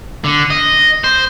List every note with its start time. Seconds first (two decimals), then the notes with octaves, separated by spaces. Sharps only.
0.24 D3
0.50 D#5
1.04 C5